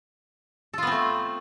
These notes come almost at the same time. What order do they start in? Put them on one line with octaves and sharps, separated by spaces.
A4 F4 B3 C4 A3